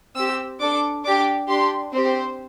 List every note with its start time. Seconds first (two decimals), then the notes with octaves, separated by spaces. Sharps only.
0.16 C4 G4 E6
0.60 D4 A4 D6
1.04 D4 G4 D6
1.48 D4 G4 C6
1.92 C4 G4 C5